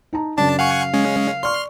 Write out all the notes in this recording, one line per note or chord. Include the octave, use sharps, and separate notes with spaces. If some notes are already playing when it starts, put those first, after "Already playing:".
D#4 A5 A#5
F#2 C#3 D4 A5
F5 F#5 G#5 C#6
G#3 C#4
D5 C6 C#6 F6